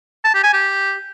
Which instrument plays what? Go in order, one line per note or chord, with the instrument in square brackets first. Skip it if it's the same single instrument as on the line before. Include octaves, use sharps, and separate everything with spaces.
[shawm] A5
G4
G#5
G4